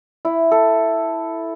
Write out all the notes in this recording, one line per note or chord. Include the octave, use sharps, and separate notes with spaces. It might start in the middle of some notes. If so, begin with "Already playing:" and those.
E4
A4